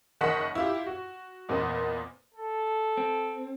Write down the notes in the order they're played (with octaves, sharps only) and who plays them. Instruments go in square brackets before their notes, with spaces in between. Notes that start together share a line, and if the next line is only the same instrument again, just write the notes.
[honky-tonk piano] F#1 D#3 D#5 F#5 C#6 B6
E4 F4 G4
F#4
E2 A#2 B3 C4 D#5
[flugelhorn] A4
[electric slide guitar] C4